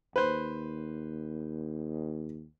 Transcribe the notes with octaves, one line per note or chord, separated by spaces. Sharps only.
D#2 B4 C5